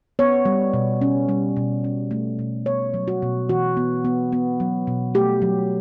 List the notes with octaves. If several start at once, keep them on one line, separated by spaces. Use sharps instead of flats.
B3 C#5
G3
B2
C#4
G3
B2
C#4
A3
B2
B3 C#5
F#3
F#4
B2
E3 F#4
B3
B3
B3
F#3
B2
A3 G4
F#3